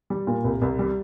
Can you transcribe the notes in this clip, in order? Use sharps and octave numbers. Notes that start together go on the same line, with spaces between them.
G3
A#2
C2
C2
G3